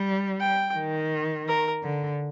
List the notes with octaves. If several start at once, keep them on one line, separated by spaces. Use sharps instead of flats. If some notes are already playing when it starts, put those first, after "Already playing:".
Already playing: G3
G5
D#3
A#4
D3